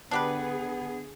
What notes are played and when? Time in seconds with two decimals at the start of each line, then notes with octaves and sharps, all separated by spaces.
0.11 D3 B3 D4 G4 G#4 B4